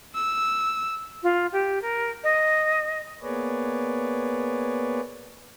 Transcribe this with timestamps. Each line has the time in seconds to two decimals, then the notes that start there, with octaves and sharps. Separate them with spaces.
0.15 E6
1.23 F4
1.52 G4
1.82 A#4
2.24 D#5
3.22 A#3 B3 G#4 B4 C#5 D5